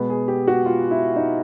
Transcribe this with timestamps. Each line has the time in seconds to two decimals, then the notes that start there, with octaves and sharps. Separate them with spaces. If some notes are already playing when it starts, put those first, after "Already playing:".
Already playing: B2 G#3 B3
0.10 G#4
0.28 G4
0.48 F#4
0.66 F4
0.91 E4
1.16 D#4